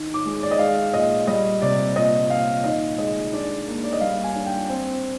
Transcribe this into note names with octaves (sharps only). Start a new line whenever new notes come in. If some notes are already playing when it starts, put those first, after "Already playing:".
Already playing: D#3
D6
G#3
D5
D#5
G#3 F5
A#2 D#5
G3 D#5
C3 D5
A#2 D#5
A#2 F5
D#3 D#5
G#3 D#5
D4 D5
A#3
D5
D#5
G3 F5
G#5
D4
G5
C4